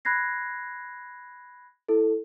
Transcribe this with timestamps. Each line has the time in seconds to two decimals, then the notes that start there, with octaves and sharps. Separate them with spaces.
0.05 B5 F#6 G#6 A#6 C7
1.89 E4 A4